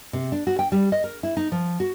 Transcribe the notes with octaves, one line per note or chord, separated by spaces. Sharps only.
C3
D4
F#4
G5
G3
D#5
A#4
E4
D#4
F3
F#4